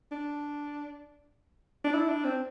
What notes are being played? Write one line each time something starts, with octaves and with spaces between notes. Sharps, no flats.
D4
D4
E4
D4
C4